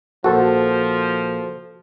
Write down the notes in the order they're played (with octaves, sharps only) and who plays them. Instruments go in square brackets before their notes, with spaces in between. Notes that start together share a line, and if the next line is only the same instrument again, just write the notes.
[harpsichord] A#1 [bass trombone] F3 [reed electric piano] F#4 A4 C5